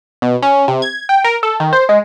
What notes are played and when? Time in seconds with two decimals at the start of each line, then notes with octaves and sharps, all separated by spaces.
0.22 B2
0.43 C#4
0.68 C3
0.82 G#6
1.09 G5
1.24 A#4
1.43 A4
1.60 D#3
1.73 C5
1.89 G#3